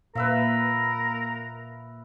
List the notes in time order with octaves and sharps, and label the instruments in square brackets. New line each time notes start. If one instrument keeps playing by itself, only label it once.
[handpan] A#2 [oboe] A#4 [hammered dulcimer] B4 E5 F5